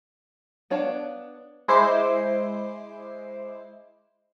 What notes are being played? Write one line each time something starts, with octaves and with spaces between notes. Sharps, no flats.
B3 D4 C#5 F5 A5
G#3 E4 C5 D6 C7